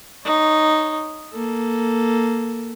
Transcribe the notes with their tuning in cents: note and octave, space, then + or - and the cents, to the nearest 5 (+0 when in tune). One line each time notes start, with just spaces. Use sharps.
D#4 -5 C#5 +0
A#3 +0 A4 +0